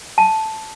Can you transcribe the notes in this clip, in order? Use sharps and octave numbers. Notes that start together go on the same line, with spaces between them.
A5